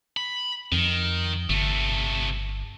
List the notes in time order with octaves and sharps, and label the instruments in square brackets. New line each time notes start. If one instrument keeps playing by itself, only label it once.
[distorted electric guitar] B5
[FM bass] F2 [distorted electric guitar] D#3
[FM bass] G1 [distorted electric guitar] C3 A3